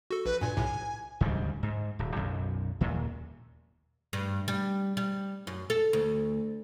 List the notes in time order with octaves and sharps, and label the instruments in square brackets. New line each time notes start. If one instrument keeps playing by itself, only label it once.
[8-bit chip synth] F#4 A4
[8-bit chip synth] A#1 [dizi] B4
[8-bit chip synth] G2 A#2 [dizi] G#5
[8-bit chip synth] B1 A2 C3
[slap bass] D2 G#2 C#3 G3
G#2
D1
B1 F#2
D#2 A#2
[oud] G2
G3
G3
F#2
A4
D2